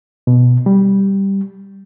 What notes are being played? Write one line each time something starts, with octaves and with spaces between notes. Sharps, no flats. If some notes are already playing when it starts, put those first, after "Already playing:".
B2
G3